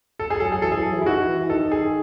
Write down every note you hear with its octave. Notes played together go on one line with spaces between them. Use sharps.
A4
G#4
F#3 A4
G#4
E3 A4
G#4
F#3
E3
E4
D#3 F#4
D#3
E3
E3
D#3 A4
G#4